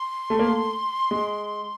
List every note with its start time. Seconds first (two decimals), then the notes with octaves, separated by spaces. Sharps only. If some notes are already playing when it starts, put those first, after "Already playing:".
Already playing: C6
0.30 A3
0.39 A#3
0.48 A3
1.11 G#3